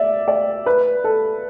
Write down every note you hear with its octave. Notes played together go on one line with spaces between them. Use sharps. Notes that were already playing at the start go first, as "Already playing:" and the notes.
Already playing: D5 E5
D5
B4
A4